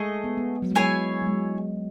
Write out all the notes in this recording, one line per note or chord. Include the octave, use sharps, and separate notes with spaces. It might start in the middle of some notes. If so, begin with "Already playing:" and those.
Already playing: G#3 A3 G#4 D#5
B3
B3
F#3
G#3
F#3 E4 G#4 C#5 G#5
F#3
G#3